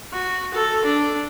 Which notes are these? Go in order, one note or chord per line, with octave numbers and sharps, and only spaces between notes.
F#4
A4
D4